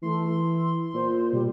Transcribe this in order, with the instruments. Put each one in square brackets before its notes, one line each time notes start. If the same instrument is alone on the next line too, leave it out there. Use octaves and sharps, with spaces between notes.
[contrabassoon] E3 [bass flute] A3 [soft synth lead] C6
[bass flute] E4
[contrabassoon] A#2 [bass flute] C5
[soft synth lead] B2 [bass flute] G3